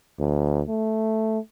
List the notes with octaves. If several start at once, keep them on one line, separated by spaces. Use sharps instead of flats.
D2
A3